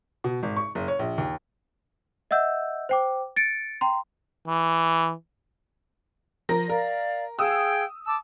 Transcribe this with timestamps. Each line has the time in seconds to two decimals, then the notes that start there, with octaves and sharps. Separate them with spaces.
0.24 B2
0.43 G#1
0.57 C#6
0.75 F#1
0.88 C#5
0.99 A#1
1.18 D#2
2.31 D#5 E5 F#5 E6 G6
2.89 C5 G5 D6
3.36 A6 C#7 D7
3.81 G5 A#5 C6
4.47 E3
6.49 F3 A#4 A#6
6.69 A#4 D5 F5
7.39 G#4 F5 G5 D#6 E6
8.07 A5 D6 E6